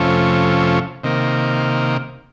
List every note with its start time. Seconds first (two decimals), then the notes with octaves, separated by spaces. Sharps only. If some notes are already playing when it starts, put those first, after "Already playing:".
Already playing: F2 C3 F3 A3 C#4
1.03 C3 D#3 A#3